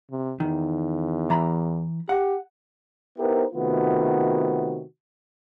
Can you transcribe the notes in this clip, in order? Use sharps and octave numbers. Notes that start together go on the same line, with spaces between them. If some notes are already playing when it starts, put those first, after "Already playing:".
C3
E2 D#3
E3 A#5 B5
G4 F#5
B3 D#4 E4 G4 A#4 C5
C3 D#3 A3 B3 F4 F#4